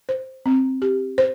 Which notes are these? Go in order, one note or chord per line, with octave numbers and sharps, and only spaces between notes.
C5
C4
G4
C5